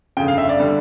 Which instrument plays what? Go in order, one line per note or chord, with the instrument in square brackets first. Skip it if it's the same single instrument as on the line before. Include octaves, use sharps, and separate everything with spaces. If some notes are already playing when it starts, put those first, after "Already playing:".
[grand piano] G1 F2 C#3 G5
F5
E5
D5
D3 G3